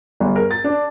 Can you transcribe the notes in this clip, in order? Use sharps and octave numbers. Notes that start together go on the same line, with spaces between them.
G1
A#4
A6
D4